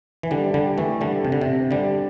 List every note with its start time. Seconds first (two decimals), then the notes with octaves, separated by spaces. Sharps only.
0.23 E3
0.31 D3 G3
0.54 D3 G3
0.78 E3 A3
1.01 D3 G3
1.25 C3
1.32 D3
1.41 C3
1.71 D3 G3